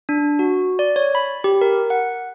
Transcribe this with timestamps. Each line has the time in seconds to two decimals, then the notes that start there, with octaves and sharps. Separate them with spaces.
0.09 D4
0.39 F#4
0.79 D5
0.96 C#5
1.15 B5
1.44 G4
1.61 A#4
1.90 F#5